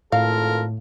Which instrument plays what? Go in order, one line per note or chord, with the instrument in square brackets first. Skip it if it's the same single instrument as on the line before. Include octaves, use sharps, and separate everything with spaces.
[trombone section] G#1 F4 A4 [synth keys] A2 [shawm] A#4 [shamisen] F5